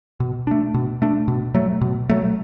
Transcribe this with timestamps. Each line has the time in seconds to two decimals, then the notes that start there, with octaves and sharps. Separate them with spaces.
0.20 B2
0.47 A3 D4
0.74 B2
1.02 A3 D4
1.28 B2
1.55 F#3 A3
1.81 B2
2.09 F#3 A3